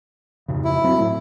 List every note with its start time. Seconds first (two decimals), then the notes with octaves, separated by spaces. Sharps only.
0.48 F2 G#2 C#3
0.64 E4
0.84 F#3 C4
0.98 A2 A3